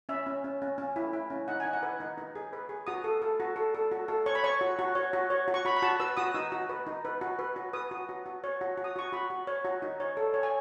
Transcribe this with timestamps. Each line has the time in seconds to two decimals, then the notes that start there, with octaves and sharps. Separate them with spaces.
0.09 C#4 E5
0.26 C#4
0.44 C#4
0.62 C#4
0.78 C#4
0.96 E4
1.13 E4
1.30 C#4
1.48 D#4 F#5
1.60 G#5
1.65 D#4
1.73 F#5
1.83 B4
2.00 D#4
2.18 D#4
2.35 G#4
2.53 B4
2.69 G#4
2.87 F#4 D#6
3.04 A4
3.22 A4
3.40 F#4
3.56 A4
3.75 A4
3.92 F#4
4.08 A4
4.26 C#5 C#6
4.35 B5
4.44 C#5 C#6
4.61 F#4
4.79 F#4
4.95 C#5
5.13 F#4
5.30 C#5
5.48 F#4
5.54 C#6
5.65 F#4 B5
5.77 B5
5.82 F#4 A5
6.00 B4 E6
6.17 F#4 D#6
6.34 D#4 E6
6.52 F#4
6.70 B4
6.87 D#4
7.05 B4
7.21 F#4
7.39 B4
7.56 F#4
7.73 B4 D#6
7.91 F#4
8.09 F#4
8.26 F#4
8.44 C#5
8.61 F#4
8.77 F#4
8.84 D#6
8.96 F#4 C#6
9.13 F#4 B5
9.30 F#4
9.47 C#5
9.65 F#4
9.82 D#4
10.00 C#5
10.17 A4
10.34 C#5
10.43 G#5